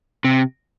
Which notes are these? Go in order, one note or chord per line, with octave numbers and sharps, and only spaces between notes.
C3